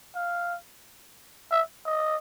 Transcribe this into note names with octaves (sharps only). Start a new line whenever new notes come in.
F5
E5
D#5